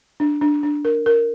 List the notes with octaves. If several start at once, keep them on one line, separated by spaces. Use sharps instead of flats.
D4
D4
D4
A#4
A#4